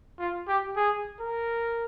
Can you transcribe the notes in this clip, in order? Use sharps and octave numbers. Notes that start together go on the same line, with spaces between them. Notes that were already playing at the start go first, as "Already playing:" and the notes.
F4
G4
G#4
A#4